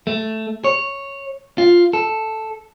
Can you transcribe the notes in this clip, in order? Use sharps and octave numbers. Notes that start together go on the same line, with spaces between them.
A3
C#5
F4
A4